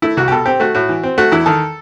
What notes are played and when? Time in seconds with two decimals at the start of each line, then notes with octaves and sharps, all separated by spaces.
0.02 A3 E4
0.17 C2 F#4
0.28 G4
0.31 B2 A4
0.46 C4 G4
0.60 A3 F#4
0.75 A2 F#4
0.89 E3
1.03 C4
1.18 A3 F#4
1.32 E2 E4
1.46 D#3 A4